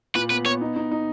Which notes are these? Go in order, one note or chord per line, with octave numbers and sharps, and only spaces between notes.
A#2 B4
B3 B4
B3 C#5
D#4
D#4
D#4